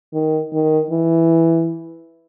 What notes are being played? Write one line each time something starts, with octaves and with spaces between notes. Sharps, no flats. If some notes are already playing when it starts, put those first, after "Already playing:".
D#3
D#3
E3